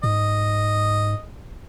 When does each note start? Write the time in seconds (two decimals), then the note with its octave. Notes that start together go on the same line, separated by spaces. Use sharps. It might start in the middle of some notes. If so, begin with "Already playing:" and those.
0.04 G#2 D#5